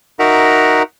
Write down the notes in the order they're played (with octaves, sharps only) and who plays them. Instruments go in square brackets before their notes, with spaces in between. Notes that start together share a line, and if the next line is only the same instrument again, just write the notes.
[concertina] D#4 F#4 A#4 E5 F#5 A#5